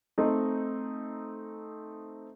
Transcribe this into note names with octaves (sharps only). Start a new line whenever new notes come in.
A3 C4 D#4